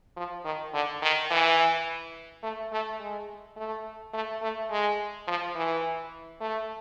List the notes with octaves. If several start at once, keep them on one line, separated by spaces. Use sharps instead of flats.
F3
D#3
D3
D#3
E3
A3
A3
G#3
A3
A3
A3
G#3
F3
E3
A3